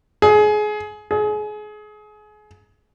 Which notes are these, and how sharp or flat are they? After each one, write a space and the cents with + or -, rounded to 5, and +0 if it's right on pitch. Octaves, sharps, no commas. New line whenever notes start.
G#4 +25
G#4 +30